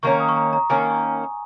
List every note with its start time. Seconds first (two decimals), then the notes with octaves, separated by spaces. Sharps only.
0.03 D#3 A#3 C#4 C#6
0.20 D#6
0.29 C#6
0.36 A#5
0.53 A#5
0.70 D#3 A#3 C#4 G#5